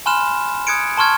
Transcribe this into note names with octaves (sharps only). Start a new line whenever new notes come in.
G#5 B5 C6 F6 F#6 E7
D#6 F#6 G#6 C#7 D7
A5 C6 C#6 F6 G#6